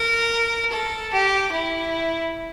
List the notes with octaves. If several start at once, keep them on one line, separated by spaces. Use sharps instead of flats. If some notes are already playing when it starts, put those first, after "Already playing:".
Already playing: A#4
A4
G4
E4